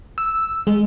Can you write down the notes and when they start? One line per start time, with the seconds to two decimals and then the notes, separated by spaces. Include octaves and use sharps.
0.18 E6
0.67 G#3